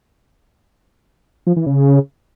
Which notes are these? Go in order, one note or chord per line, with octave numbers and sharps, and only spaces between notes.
F3
E3
C#3